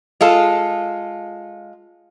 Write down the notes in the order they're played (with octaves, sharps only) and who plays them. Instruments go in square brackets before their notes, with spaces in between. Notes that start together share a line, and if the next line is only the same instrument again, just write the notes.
[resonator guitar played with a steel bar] G#3 F4 A4